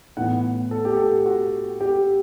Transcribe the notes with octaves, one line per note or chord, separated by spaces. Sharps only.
A2 E3 B3 F#5
A4
G4
A4
F#4
G4